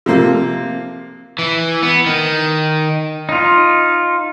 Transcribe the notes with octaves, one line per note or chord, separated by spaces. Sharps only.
C3 F3 A#3 F4
E3
B3
D#3
D#4 F4